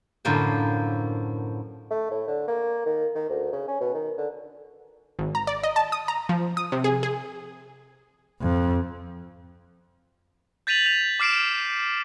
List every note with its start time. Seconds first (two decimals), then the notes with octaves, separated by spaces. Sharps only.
0.25 F#2 A2 D3 F3 A#3 C5
1.91 A3
2.11 A2
2.28 D3
2.48 A#3
2.86 D#3
3.15 D#3
3.29 D2
3.52 C#3
3.68 C#4
3.80 B2
3.94 D#3
4.18 D3
5.19 G#1
5.35 A#5
5.47 D5
5.63 D#5
5.76 A5
5.92 D#6
6.08 A#5
6.29 F3
6.57 D#6
6.72 C3
6.84 G#4
7.03 G#4
8.41 F2
10.67 G6 A6 B6 D#7 F7 F#7
10.86 G6 F7
11.20 D6 F6 C7 D7 E7